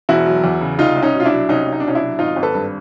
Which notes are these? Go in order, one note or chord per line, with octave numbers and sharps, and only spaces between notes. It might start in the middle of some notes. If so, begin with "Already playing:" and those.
E1 E4 F#4
F#3
E2
C#3
C2 D#4 F4
C2
C#4 D#4
B2
F4
D4 E4
F#3
C2 C#4 D#4
C2
D#4
D4
B2 C#4 D#4
D4 E4
F#3
G#1 D#4 F4
G#1
A4 B4
G2